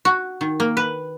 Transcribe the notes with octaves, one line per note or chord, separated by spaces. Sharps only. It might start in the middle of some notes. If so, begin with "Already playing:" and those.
F#4
D#3
A#3
B4